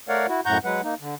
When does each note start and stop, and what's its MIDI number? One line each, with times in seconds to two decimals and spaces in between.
0.09 0.26 57
0.09 0.26 70
0.09 0.26 73
0.09 0.26 74
0.09 0.26 77
0.09 0.26 78
0.29 0.41 64
0.29 0.41 66
0.46 0.58 42
0.46 0.58 45
0.46 0.58 78
0.46 0.58 82
0.46 0.58 85
0.46 0.58 91
0.64 0.81 54
0.64 0.81 56
0.64 0.81 71
0.64 0.81 78
0.84 0.94 58
0.84 0.94 63
1.00 1.15 50